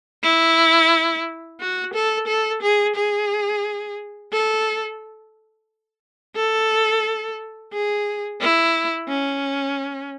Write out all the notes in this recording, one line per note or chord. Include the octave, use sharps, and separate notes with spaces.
E4
F#4
A4
A4
G#4
G#4
A4
A4
G#4
E4
C#4